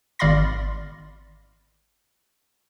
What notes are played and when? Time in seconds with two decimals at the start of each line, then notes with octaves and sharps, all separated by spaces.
0.19 G#1 D5 F5 B5 C6 A#6